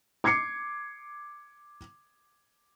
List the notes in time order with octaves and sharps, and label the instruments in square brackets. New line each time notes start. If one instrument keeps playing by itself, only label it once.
[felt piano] D6 G#6 C7 C#7